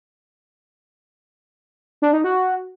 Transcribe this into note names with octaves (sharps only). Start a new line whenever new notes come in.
D4
D#4
F#4